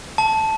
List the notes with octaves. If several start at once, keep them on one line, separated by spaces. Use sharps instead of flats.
A5